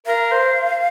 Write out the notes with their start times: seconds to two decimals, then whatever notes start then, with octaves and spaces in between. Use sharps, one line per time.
0.06 A#4 F5
0.32 C5